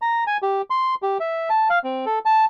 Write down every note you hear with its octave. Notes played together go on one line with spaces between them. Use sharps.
A#5
G#5
G4
C6
G4
E5
A5
F5
C4
A4
A5